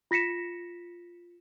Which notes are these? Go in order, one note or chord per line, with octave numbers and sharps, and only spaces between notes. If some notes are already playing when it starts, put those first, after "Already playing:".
F4 A#6 B6 C#7 E7